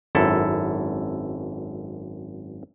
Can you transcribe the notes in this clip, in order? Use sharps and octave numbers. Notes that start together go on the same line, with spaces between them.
G#1 F#2 E4 A4